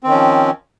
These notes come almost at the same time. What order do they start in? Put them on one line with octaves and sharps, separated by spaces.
C4 D#3 C#4 F3